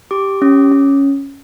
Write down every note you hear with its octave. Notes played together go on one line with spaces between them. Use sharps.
G4 D6
C#4
C#4